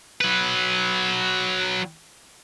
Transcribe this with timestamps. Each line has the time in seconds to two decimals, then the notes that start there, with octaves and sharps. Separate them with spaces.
0.21 F#3 B4